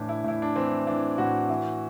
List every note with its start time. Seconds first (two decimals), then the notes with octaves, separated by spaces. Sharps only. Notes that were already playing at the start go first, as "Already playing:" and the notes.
Already playing: A2 E3 D4
0.09 E4
0.24 A2 E4
0.42 D4
0.56 E3 C4
0.87 E3 D4
1.18 A2 F#4
1.49 E3